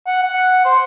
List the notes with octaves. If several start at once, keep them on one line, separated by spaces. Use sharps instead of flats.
F#5
F#5
C5